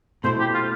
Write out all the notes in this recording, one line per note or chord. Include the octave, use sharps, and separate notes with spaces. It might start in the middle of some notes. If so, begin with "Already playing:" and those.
B2 A3 E4 C5
G4
F4